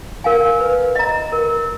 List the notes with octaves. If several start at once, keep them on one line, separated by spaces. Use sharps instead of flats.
A#4 F5 G#5
B4
D#5 A#5
A#4